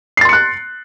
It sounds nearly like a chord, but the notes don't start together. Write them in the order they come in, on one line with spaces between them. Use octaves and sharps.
C7 A6 C6 C#7 F#6